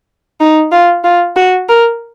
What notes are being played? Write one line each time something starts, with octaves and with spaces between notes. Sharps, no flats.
D#4
F4
F4
F#4
A#4